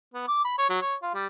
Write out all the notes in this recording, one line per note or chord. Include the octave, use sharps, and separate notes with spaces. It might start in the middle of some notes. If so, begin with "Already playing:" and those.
B3
D6
B5
C#5
F#3
C#5
F4
G3